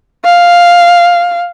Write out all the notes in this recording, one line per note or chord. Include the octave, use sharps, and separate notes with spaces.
F5